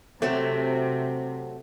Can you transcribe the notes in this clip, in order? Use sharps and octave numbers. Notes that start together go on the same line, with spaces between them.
C3 F#3 A3 C4 F#4